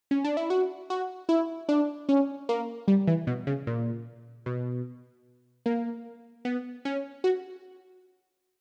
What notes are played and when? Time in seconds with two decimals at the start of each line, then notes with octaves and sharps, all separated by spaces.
0.11 C#4
0.24 D4
0.37 E4
0.50 F#4
0.90 F#4
1.29 E4
1.69 D4
2.09 C#4
2.49 A#3
2.88 G3
3.07 E3
3.27 B2
3.47 C#3
3.67 A#2
4.46 B2
5.66 A#3
6.45 B3
6.85 C#4
7.24 F#4